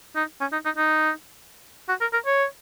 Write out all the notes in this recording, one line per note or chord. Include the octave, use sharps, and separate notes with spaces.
D#4
C#4
D#4
D#4
D#4
F#4
A#4
A#4
C#5